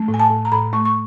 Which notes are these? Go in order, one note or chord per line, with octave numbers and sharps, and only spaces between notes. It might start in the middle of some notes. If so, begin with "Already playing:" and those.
Already playing: A3
A2
G#5
A5
A2
A#5
A2 B5
A3 C#6
C#6